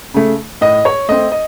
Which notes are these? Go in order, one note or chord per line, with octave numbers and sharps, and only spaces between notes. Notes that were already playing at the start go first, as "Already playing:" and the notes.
C#3 A3
A2 D#5
C#5
A3 C4 D#5
D#5